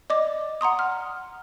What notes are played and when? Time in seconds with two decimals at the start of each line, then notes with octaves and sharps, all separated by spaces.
0.10 D5 D#5 D6
0.61 F#5 A#5 C6 D#6
0.79 F6